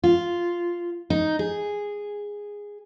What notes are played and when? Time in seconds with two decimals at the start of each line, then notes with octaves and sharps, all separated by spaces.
0.04 F4
1.10 D#4
1.39 G#4